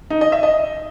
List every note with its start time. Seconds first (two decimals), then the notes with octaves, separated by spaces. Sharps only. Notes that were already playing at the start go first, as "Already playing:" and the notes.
0.10 D#4
0.21 D#5
0.32 E5
0.43 D#5